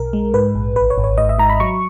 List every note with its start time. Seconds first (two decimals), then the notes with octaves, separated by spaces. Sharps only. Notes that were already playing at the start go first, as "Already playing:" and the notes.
Already playing: B1 A#4
0.13 G#3
0.34 G#2 B4
0.55 A#1
0.76 G#1 B4
0.90 C#5
0.98 G#1
1.04 C#5
1.18 G#2 D#5
1.29 E5
1.39 G#2 A#5
1.49 B5
1.60 F#3 C#6